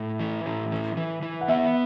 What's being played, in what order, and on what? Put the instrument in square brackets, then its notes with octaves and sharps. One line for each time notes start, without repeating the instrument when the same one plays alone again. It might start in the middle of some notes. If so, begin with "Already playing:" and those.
Already playing: [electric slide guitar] A2
E3
A2
E3
E3
E3
[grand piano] F#5
[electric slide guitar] B3 [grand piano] E5